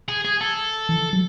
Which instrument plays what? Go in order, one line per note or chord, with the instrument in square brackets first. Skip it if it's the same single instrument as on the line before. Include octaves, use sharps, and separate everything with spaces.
[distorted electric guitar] G#4
G#4
A4
[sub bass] E3
F#3